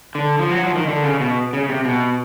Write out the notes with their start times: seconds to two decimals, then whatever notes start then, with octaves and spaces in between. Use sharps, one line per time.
0.15 D3
0.39 F3
0.51 F#3
0.63 F3
0.75 D#3
0.87 D3
1.04 C#3
1.20 B2
1.53 C#3
1.69 C3
1.85 B2